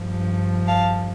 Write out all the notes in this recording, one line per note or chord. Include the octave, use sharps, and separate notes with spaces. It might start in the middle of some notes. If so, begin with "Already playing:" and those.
Already playing: G2 F3
F5 A5